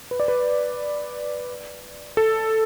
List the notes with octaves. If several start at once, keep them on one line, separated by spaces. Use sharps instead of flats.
B4
D5
B4
A4